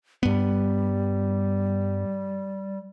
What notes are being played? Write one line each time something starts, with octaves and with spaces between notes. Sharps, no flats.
G2 G3 B3